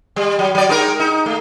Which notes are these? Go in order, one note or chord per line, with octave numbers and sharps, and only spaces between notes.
G3
F#3
F#3 D5
G#3 D#4 A#4
D#4
A3